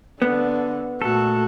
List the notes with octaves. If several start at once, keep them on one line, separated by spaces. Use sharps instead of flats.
D3 B3
A#2 A3 F#4 A4